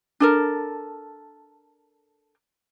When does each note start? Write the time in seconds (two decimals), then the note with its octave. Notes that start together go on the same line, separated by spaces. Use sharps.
0.20 D4 A4 A#4